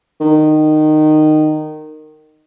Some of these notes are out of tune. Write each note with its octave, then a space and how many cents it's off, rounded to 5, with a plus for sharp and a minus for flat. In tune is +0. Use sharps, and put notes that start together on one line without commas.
D#3 -15